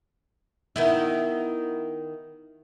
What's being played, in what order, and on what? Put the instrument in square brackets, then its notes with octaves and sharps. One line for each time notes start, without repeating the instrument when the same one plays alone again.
[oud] D#3 B3 E4